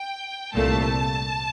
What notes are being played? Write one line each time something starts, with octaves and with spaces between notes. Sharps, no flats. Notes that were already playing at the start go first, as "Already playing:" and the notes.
Already playing: G5
C2 A#2 A3 A5